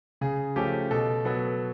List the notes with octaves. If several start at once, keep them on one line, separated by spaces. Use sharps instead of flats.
C#3 G#4
F3 A3 C#4 G4
B2 A4
F#3 B3 A4